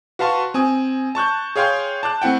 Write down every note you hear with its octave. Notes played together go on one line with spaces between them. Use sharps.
F#4 B4 F5 A5 C6 C#6
C4 G#5 D#6
A5 C#6 F#6 G6
G#4 C#5 F5 G5 C6 G6
A5 D6 F#6
A3 C4 E4 F#5 G5